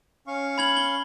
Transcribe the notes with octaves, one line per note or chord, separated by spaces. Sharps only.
C#4 F5 C#6
B5 G#6 F#7
G7